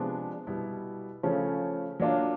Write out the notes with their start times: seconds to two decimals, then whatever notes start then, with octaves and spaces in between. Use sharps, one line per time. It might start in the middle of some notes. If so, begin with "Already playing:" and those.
Already playing: C3 F3 G#3 B3 D4
0.47 B2 G3 B3 E4
1.23 C#3 F3 A3 C#4
2.00 F#3 A#3 D4 F4